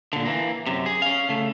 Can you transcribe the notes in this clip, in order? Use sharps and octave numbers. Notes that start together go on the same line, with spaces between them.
A#2 D3
E3 A#3
F#2 C3
G#4
C#4 F5
C#3 A3